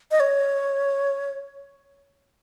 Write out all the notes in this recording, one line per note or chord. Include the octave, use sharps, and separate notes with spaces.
D#5
C#5